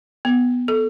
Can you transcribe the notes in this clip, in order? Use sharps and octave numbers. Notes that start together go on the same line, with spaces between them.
B3
A4